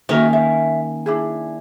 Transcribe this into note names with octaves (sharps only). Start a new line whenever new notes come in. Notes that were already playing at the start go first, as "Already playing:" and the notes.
D#3 A#3 C#4 F#4 A#4 E5
E5
D4 E4 G#4